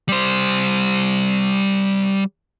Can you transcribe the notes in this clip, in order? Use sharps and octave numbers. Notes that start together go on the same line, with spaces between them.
G3 C5